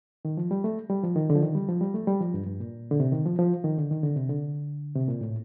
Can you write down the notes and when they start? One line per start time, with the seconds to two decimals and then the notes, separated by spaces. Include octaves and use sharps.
0.25 D#3
0.37 F3
0.51 G3
0.64 A3
0.90 G3
1.03 F3
1.16 D#3
1.30 D3
1.36 F3
1.42 D#3
1.55 G3
1.69 F3
1.81 G3
1.94 A3
2.07 G3
2.21 F3
2.34 G2
2.46 G2
2.60 A#2
2.91 D3
3.00 C3
3.12 D#3
3.26 F3
3.39 F3
3.64 D#3
3.78 D3
3.91 D#3
4.03 D3
4.16 C3
4.29 D3
4.95 C3
5.08 A#2
5.21 A2